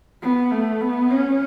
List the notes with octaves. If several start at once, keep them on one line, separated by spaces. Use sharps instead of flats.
B3
A3
B3
C#4